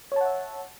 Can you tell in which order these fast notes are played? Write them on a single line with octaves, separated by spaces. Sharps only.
C#5 A5 F#5 E5